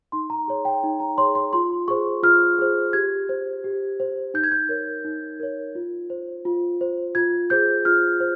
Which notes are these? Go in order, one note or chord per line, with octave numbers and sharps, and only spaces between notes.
D#4 C6
A#5
G#4 C#5
G5
D#4
A#5
G#4 C#5 C6
C6
F4 C6
G#4 C5 C#6
F4 F6
G#4 C5
G4 G#6
C5
G4
C5
D#4 G6
G#6
G6
A#4 C#5
D#4
A#4 C#5
F4
C5
F4
C5
F4 G#6
G#4 C5 G6
F4 F6
C5